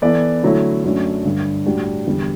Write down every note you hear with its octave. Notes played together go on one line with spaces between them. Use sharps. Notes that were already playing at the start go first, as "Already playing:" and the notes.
E3 B3 E4 A4 D5
D3 F#3 A3 E4
F#2 F#3 A3 D4
G2 D3 G3
A2 G3 D4 F#4
E2 D3 G3